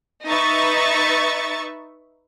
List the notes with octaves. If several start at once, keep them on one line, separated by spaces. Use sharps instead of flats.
D#4 B4 E5 C#6 A6